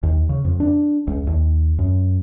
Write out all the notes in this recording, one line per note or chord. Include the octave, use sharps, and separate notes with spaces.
D#2
C#3
F2
D4
C#2
D#2
F#2